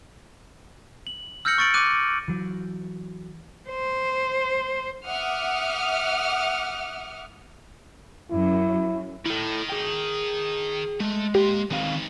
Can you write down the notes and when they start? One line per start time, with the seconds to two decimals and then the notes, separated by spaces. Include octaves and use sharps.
1.07 F#7
1.45 E6 F6 G6 A#6 C#7 F#7
1.58 C#6 A6 C#7 D7 F#7
1.74 D6 F#6 D#7
2.28 E3 F#3
3.69 C5
5.06 E5 F#5 D6 D#6 F6
8.32 F#2 E4
9.26 D#3 E4 A4
9.69 G#4 G5
11.00 G#3 A3
11.35 A#3 G4 C6
11.71 D#3 C4 D#4 B4 F5